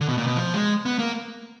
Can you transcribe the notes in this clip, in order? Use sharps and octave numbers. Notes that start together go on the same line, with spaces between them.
D3
B2
A#2
B2
F3
G#3
B3
A#3